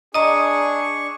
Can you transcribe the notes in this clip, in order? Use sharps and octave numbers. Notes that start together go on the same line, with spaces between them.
D4 G#4 D#5 A#5 C#6 D#6